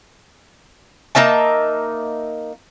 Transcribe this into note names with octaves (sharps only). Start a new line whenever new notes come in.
A#3 D#4 E5 A5